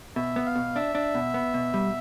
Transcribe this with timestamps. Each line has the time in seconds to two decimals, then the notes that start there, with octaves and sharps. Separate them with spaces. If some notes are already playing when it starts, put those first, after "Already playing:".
0.16 B2 E5
0.36 B3
0.46 F5
0.56 B2
0.75 D4 E5
0.95 D4
1.15 B2
1.34 B3
1.54 B2
1.74 G3